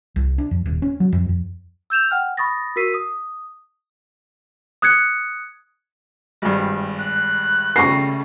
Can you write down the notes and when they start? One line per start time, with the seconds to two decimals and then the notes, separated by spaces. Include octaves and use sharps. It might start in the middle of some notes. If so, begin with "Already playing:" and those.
0.16 C2
0.38 D4
0.51 F2
0.66 D#1
0.82 C#4
1.00 F#3
1.13 F2
1.29 F2
1.90 E6 G6 E7 F7
2.11 F#5 G5 F6
2.37 B5 C#6 D#6 A6 A#6
2.76 F#4 A#4 E6 B6 C7 D#7
2.94 D#6
4.82 D#6 F#6 G#6 C#7
6.42 G#1 G2
6.99 F#6
7.76 C#3 G3 A3 C#6 A#6 C7